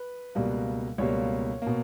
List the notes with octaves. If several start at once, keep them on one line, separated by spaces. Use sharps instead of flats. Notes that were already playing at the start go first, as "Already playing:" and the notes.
Already playing: B4
C#2 B2 G3 A#3
C#2 B2 G3 A#3 C#5
B2 A#3